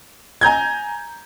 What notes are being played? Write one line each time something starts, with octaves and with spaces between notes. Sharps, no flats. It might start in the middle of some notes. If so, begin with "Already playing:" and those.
G#5 A#5 G6 G#6